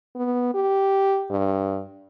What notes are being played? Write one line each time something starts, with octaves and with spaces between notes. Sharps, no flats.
B3
G4
G2